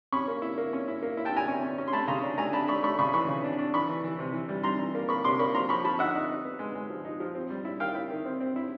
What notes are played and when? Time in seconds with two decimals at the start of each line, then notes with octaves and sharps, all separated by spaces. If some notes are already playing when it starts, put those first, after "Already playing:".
0.12 C#4 B5 C#6
0.28 A#3
0.42 E4
0.58 A#3
0.73 C#4
0.88 E4
1.03 A#3
1.17 E4
1.25 G5 A5
1.33 E4 G#5 A#5
1.48 C#4
1.63 C#4
1.78 C#4
1.88 C6
1.93 A3 A5 B5
2.08 C#3 A#5 C6
2.23 D4
2.38 A3 G#5 A#5
2.53 D4 A5 B5
2.68 A3 B5 C#6
2.83 A3 B5 C#6
2.99 C#3 B5 C#6
3.13 E3 B5 C#6
3.29 C#3
3.44 D4
3.59 D4
3.74 E3 B5 C#6
3.89 E3
4.04 E3
4.19 C3
4.34 E3
4.49 G3
4.63 G3 A#5 C6
4.79 E3
4.95 A#3
5.09 A#3 B5 C#6
5.24 C3 C6 D6
5.39 A#3 B5 C#6
5.55 F3 A#5 C6
5.69 F3 B5 C#6
5.85 F3 A5 B5
5.99 D#4 E5 F#5
6.15 D#4
6.29 D#4
6.45 B3
6.59 G#3
6.75 G#3
6.90 F3
7.05 D#4
7.20 F3
7.35 C4
7.50 G3
7.65 E4
7.80 D#3 F5 G5
7.95 E4
8.10 D#3
8.25 C4
8.41 C4
8.56 E4